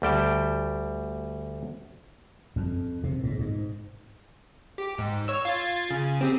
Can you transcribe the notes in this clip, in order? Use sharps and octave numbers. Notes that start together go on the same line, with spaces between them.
D2 G3 G5 A5
F2
C3
G#2
G#2
G4
G#2
C#5 E6
F4 G#6 A6
C#3
C4 G4 G#4